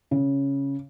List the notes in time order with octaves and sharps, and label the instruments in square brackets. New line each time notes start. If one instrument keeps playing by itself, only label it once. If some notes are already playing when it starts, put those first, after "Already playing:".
[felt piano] C#3